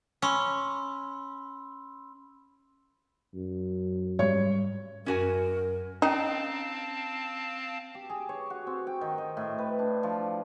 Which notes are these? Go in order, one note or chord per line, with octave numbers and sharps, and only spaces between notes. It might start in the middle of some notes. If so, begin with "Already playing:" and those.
C#4 B5 C6 E6
F#2
G#2 G3 C#5
F#2 C#4 F#4 A#4 G#5
C4 C#4 D#4 C#5 F5 G5 A5
G4
G#4
C#5
F#4
C4
G5
D#3
D#5
A2
B4
D4
F3